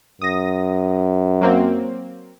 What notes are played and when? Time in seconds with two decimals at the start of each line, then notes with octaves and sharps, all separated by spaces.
0.22 F#2 D#6 A#6
1.41 F#3 A#3 C4